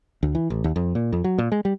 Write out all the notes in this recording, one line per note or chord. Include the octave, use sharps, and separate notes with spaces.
D2
E3
A1
D#2
F2
A#2
F2
F#3
A#2
G#3
G3